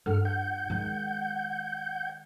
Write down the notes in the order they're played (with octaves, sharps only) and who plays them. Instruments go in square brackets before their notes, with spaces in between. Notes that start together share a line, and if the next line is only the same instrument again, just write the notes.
[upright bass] G2 F4 [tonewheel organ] A4 F#5 F6
[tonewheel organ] F#5 G6
[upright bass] D#3 G#3